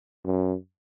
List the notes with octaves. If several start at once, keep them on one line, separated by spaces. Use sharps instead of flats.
F#2